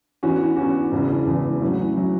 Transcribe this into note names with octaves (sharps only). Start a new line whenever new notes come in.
E2 E3 C#4 F#4
E2 E3 C#4 F#4
E1 E2 C#3 E3
E1 E2 C#3 E3
A1 A2 F#3 C#4 E4
A2 F#3 C#4 E4